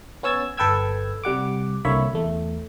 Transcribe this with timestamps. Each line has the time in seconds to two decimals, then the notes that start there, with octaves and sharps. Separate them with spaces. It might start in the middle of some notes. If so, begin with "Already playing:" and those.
0.23 B3 C#4 C#5 E6 G#6 A6
0.57 G1 A4 B4 G5 E6 G#6
1.24 C3 G3 F#5 D6
1.85 C2 D3 A#3 C#5 E5 B5
2.13 E2 A3